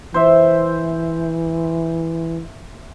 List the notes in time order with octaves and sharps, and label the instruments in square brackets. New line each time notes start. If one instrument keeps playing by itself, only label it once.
[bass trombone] E3 [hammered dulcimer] C5 E5